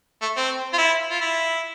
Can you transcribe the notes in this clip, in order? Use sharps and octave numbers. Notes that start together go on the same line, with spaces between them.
A3
C4
F4
E4
F4
E4